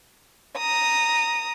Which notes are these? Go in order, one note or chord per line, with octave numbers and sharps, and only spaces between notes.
A#5 D#6